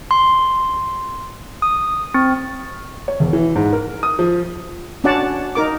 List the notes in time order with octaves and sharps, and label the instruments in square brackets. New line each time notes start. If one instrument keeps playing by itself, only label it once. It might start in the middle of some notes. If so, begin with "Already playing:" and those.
[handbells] C6
D#6
C4
[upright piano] C#5
E1
E3
G#2
A#4
D#6
F3
[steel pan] C#4 D4 F#4 D5 F#5 A5
D#4 A#4 D6